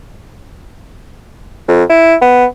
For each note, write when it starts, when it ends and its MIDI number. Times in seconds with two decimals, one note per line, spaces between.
1.68 1.84 41
1.90 2.15 64
2.22 2.45 59